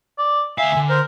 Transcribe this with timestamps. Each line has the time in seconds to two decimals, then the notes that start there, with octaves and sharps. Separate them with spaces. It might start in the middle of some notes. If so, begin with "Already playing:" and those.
0.18 D5
0.58 D2 E5 F5 G#5
0.76 D3
0.89 A#4 C5